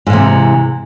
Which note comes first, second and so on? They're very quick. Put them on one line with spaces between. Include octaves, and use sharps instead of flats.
G#2 E3 C3